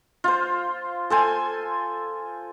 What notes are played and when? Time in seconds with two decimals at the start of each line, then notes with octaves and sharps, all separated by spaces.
0.24 F4 C5
1.10 A4 C5 G#5